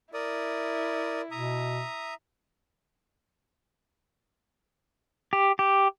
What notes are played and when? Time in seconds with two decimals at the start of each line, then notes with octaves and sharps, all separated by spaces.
0.14 E4 A#4 D5 D#6
1.31 B2 E5 A#5 D#6
5.33 G4
5.59 G4